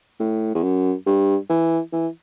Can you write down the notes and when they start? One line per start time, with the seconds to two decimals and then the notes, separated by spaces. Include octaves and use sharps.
0.20 A2
0.55 E2
0.63 F#2
1.06 G2
1.50 E3
1.93 E3